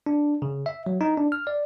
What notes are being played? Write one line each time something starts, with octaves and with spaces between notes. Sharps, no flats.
D4
C#3
E5
F#3
D#4
D4
F6
D5